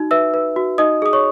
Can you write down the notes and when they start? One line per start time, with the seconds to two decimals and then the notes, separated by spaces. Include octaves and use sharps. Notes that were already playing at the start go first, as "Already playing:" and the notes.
Already playing: D#4 F#4
0.11 B4 E5 E6
0.34 B4
0.56 F#4
0.78 D#4 D#5 D#6
1.02 G#4 D#6
1.13 C#5 C#6